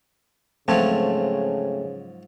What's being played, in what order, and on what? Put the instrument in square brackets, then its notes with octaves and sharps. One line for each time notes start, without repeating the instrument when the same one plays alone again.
[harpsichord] G#2 F3 F#3 [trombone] C#3 [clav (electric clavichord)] A3 C4 A5